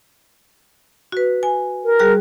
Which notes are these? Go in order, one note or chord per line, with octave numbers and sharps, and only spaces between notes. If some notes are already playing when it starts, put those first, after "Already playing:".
F#4 B4
G#5
A#4
G3 G#4 F#6